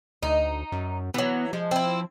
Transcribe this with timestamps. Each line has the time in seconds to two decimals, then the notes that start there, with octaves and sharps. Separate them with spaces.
0.23 D2 D#4
0.72 F#2
1.14 E3 F#3 B3
1.53 F3 G#3
1.71 C4 E4